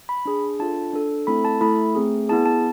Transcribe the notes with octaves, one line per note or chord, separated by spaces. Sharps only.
B5
D4 G#4
D4 F4 A4 A5
D4 A4
A3 C4 E4 A4 B5
A5
A3 E4 A4 B5
A3 C4 G#4
B3 E4 G#4 A5
A5